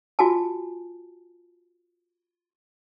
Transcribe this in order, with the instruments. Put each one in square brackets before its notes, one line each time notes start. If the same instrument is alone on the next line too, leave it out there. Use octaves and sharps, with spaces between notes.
[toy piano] F4 F#4 G#5 A5